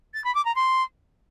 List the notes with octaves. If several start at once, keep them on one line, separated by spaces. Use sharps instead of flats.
A6
B5
D6
A#5
C6